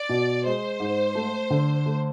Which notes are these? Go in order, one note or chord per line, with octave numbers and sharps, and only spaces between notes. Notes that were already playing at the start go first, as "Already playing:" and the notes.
Already playing: D5
B2
G#3 C5
G#2
A3
D3
A3